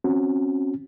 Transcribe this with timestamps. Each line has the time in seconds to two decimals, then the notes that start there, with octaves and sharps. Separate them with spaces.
0.04 C4 C#4 F#4